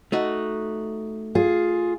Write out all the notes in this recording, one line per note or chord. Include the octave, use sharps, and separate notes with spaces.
A3 D#4 F#4
F4 G#4